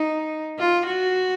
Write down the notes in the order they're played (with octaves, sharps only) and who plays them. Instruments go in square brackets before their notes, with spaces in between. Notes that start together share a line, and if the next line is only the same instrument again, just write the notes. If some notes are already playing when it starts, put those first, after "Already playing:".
Already playing: [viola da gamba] D#4
F4
F#4